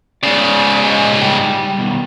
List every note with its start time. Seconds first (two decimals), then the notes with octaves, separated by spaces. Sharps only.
0.23 G#2 C#3 D5
0.84 A#2 D#5 G#5
1.22 G3 G5
1.79 B2 D#3